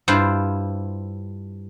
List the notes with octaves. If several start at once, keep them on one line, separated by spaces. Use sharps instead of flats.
G2 E4 F4 C5